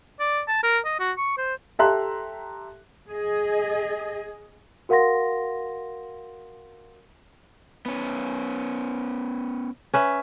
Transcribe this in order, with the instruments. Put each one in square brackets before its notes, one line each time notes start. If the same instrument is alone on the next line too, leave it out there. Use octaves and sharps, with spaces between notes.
[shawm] D5
A5
A#4
D#5
F#4
C#6
C5
[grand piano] G4 A4 E5 A#5 C6 F#6
[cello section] G#4 D#5
[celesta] F#4 A#4 F5 F#5 C6 A#6
[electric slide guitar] B3 C#4
[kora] C#4 B4 E5